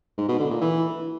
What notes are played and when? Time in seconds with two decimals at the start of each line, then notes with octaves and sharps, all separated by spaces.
0.18 G#2
0.29 B2
0.39 D3
0.50 A#2
0.61 E3